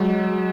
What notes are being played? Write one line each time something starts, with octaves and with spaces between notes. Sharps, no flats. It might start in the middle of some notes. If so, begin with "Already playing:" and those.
Already playing: F#3 G#3